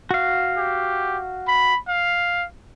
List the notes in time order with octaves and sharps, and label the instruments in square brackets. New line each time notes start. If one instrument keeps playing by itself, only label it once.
[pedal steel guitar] F#4 F5
[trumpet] G4
B5
F5